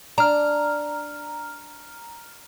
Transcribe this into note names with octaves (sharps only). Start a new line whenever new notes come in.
D4 A#5 F6